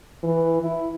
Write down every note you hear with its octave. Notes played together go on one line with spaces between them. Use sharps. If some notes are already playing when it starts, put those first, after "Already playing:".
E3
E4